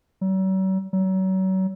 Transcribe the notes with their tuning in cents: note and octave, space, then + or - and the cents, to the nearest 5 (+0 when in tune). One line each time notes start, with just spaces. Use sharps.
F#3 +45
F#3 +35